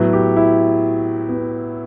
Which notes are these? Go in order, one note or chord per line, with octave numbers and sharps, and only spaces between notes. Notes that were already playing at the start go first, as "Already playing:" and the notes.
Already playing: A2 F#3 B3
G4
E4
B3